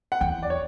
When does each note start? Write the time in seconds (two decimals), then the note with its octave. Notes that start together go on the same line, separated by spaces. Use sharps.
0.12 F#5
0.21 E2 G5
0.43 D5
0.50 C#5